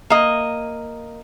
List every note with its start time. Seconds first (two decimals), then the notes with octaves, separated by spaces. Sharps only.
0.10 A#3 D#5